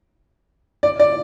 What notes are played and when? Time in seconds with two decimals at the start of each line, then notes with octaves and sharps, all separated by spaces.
0.83 D5
1.00 D5